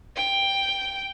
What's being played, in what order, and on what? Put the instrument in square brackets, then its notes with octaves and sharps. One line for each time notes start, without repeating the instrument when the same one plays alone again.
[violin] G5